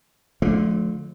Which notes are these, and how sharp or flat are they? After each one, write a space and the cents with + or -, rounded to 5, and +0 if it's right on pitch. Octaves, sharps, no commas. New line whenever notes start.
D3 +0 F3 +25 A3 -30